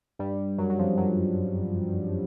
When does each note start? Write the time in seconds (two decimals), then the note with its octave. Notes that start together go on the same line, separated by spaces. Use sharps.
0.19 G2 G3
0.58 F#2 F#3
0.70 F#3
0.78 F2 F3
0.97 F#2 F#3